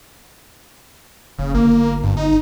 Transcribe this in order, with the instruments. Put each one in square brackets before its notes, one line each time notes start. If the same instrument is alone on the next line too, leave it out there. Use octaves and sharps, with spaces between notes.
[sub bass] F#1 [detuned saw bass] C#3
[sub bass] G1 [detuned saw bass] A#3
[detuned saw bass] G2
D#4